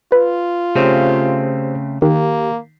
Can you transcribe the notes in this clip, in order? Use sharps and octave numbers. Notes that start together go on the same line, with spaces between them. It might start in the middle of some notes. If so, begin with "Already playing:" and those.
F4 B4
C#3 A3 C4 G4 C5 C#5
D#3 A#3 G4